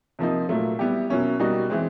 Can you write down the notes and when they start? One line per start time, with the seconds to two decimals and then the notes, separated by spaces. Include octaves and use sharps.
0.19 C3 F3 A#3 D#4
0.49 A#2 F#3 A3
0.79 G3 B3 E4 G4
1.10 B2 F#3 A#3 C#4 E4
1.40 B2 G3 A#3 D#4 F#4
1.70 E3 G#3 C4